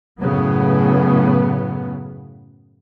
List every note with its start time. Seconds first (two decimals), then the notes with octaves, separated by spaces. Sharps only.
0.21 F#2 A2 C#3 B3